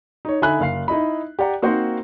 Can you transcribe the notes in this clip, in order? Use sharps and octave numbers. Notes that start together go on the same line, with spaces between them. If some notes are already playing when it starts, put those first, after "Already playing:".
D#4 C#5
D3 D#4 E5 G#5 B5 F#6
F#1 F5 C7
D#4 E4 D#5 B5
G4 D5 F#5 A#5
A#3 C4 D#4 F#4 C5 F#5